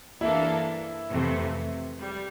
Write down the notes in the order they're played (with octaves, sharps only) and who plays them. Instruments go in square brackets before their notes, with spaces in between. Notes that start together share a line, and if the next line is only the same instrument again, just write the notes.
[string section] G2 E3 A#3 D4 A4 [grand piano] E4
[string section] F2 C3 E3 A3
G3